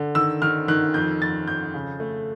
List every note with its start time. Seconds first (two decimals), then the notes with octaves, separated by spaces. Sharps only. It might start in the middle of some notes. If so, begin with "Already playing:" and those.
Already playing: D3
0.15 D#3 E6
0.42 D#3 F6
0.68 D#3 F#6
0.94 F2 G6
1.22 F2 A6
1.47 F2 G6
1.74 C#3
2.00 A3